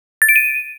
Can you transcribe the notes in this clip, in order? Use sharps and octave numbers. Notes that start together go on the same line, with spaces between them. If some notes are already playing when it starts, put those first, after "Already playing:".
A6
D7
D#7